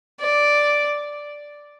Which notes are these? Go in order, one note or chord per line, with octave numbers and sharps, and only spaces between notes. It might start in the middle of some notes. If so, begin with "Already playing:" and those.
D5